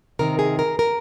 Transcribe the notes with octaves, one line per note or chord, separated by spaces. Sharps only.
C3 D#3 A#4
G#4
A#4
A#4